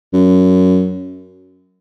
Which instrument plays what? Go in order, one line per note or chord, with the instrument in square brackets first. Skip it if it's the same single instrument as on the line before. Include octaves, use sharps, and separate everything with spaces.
[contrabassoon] F#2